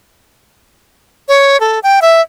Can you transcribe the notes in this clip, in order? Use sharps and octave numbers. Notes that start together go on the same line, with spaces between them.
C#5
A4
G5
E5